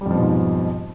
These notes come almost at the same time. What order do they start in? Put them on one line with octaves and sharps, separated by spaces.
G3 F2 F3 B2 G#2